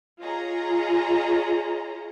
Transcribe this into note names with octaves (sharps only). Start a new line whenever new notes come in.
F4 G#4 C#5 D#5 A#5